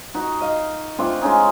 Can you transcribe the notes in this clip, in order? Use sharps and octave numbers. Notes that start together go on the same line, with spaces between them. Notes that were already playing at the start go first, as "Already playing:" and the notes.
D#4 F#4
D#5 F5
A3 C4 D4 F4
F3 G#3 C#4 D#4